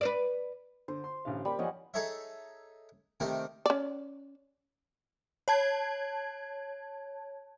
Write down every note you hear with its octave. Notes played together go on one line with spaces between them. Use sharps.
B4 C5 D5
D3 C5
C6
A1 D3 F5
G3 A#3 B5
F3 C#5 D#5 F#5 G#5
D#4 G#4 A4 C#5 D#5 E5
C3 D#3 A3 D#4 G4
C#4 D5
C#5 A5 G#6